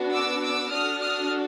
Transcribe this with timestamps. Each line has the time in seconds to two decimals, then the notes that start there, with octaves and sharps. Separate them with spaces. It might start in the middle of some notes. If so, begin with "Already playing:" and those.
Already playing: B3 D4 F#4
0.12 D6 E6
0.42 D6 E6
0.71 D4 F#4 A4 D#6 F6
1.01 D#6 F6